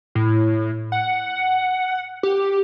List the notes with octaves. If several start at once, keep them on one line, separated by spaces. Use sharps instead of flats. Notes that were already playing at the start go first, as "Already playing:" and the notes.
A2
F#5
G4